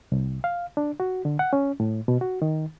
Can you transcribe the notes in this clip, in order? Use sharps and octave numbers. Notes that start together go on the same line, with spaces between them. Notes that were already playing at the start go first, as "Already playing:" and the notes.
C2
F5
D4
F#4
D3
F#5
C#4
A2
B2
F#4
D#3